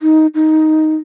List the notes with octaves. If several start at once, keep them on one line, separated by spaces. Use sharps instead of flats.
D#4
D#4